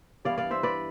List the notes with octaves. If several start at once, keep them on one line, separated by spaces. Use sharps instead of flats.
G2 E3 B3 D5 F5
D5 F5
C5 E5
B4 D5